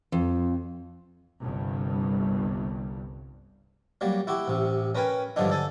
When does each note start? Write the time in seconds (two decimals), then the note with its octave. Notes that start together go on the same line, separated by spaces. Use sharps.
0.12 F2
1.41 G1 C2 G2
4.01 F#3 G3 A#3
4.27 E4 F#4 G4
4.48 A1 C3
4.95 C#4 A#4 B4 G5 G#5
5.36 G2 D3 F3 F#3 D4 D#4
5.50 D3 A4 G#5